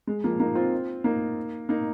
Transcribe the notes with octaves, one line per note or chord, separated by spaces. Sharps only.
G#3
F3 A#3
A#3 D#4
C4 F4
A#3 D#4
A#3 D#4